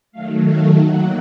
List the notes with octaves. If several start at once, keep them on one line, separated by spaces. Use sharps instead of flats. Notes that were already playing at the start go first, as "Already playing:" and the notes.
D#3 F#3 A3 F5
F5
D#3 F#3 A#3 F#5